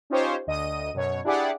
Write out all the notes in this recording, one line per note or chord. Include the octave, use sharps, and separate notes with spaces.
C#4 D#4 F4 G4 C5 C#5
D2 D#5 D#6 D#7
F#2 B2 C#5
D4 E4 G4 G#4 D5 F#5